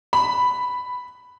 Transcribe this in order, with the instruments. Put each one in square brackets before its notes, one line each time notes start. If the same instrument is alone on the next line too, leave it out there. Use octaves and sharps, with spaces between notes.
[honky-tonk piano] B5